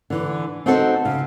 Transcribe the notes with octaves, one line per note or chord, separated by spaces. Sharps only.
D3 E3
C4 D#4 F#4 A4 C5
C#3